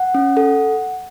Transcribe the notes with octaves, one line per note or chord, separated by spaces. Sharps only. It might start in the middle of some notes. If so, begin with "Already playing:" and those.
Already playing: F#5
C#4
A4